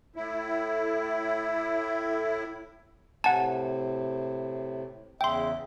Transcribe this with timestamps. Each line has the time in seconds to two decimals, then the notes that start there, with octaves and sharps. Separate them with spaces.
0.16 A2 E4
3.24 A2 C3 F#5 G#5 A5
5.21 E2 C#3 E5 G5 C6